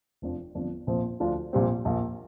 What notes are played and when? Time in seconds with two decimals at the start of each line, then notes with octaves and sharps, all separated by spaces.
0.22 F1 F2 F3 D4
0.55 G1 F2 F3 D4
0.87 A#1 A#2 F3 C4
1.20 D2 D3 F3 D4 F4
1.53 A#1 A#2 G3 C4
1.85 A#1 A#2 A#3